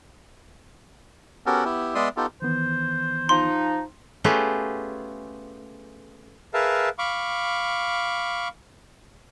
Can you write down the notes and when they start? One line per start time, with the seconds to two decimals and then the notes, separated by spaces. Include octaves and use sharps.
1.46 B3 C#4 F#4 G4 A4 A#4
1.65 B3 E4 G4
1.95 G#3 B3 D5 E5 C6 D#6
2.17 B3 D#4 F4 G4 A4
2.42 D#3 E3 B3 C5
3.29 F3 D#4 C6
4.24 A3 B3 C#4 F4 G4 G#4
6.54 G#4 A#4 B4 E5 F5 A5
6.99 F5 B5 C#6 D6